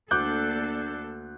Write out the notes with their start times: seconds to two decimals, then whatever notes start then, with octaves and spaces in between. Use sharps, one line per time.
0.11 D2 A#3 D4 A4 D6 F#6 G6